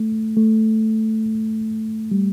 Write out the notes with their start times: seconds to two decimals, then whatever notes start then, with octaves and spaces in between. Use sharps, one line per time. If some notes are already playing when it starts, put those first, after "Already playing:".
Already playing: A3
0.36 A3
2.11 G3